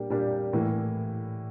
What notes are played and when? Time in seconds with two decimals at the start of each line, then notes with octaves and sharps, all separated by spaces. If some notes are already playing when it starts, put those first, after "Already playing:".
Already playing: A#2 G3 A#3 D4 G4
0.10 A#2 G3 A#3 D4 G4
0.53 A2 E3 A#3